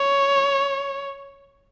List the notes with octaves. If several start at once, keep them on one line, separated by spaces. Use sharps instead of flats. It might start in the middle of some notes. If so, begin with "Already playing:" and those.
Already playing: C#5